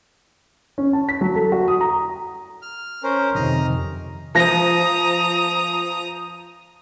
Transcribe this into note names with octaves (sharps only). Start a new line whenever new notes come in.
C#4
A5
B6
F#3
A4
F#4
D#6
A#5
F6
C#4 A#4 C5
F2 C3 D#3 A#5 D#6 F6
F3 A#5 D#6 A#6